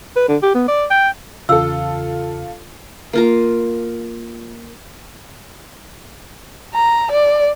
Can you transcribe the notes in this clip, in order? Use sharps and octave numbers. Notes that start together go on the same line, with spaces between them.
B4
D3
G4
B3
D5
G5
E2 C#3 F4 A4 E6
A#3 F4 A#5
A#5
D5